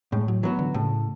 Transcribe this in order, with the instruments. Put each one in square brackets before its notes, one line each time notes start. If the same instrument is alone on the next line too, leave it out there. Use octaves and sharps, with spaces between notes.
[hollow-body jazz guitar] A2 [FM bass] G#3
[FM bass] F#3
[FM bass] E3 [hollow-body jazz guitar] F#3 B3 F#4
[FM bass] D3
[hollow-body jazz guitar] A2 [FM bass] C#3